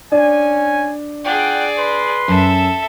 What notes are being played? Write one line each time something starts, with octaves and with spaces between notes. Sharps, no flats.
C#4 D4 G#5
F4 G#4 D5 F#5 G5
B4 C6
F#2 A4 E5